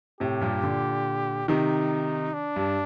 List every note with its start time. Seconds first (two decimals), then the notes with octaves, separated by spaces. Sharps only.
0.20 A2 C3 G4
0.41 G2 A#2
0.63 A#2 D3
1.48 C3 D#3 D#4
2.34 D4
2.56 G2